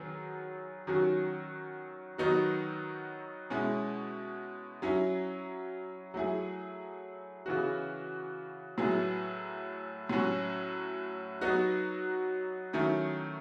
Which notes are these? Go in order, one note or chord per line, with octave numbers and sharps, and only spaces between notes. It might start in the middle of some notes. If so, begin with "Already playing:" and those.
Already playing: D#3 F#3 B3 G#4
D#3 F#3 C#4 F#4
D#3 F#3 B3 D#4 F#4
B2 G#3 C#4 E4
F#3 C#4 E4
F#3 A3 E4 G#4
C#3 E3 B3 F#4
A2 F#3 B3 E4 G#4
A2 F#3 C#4 F#4
F#3 B3 D#4 F#4
D#3 F#3 A3 C#4 E4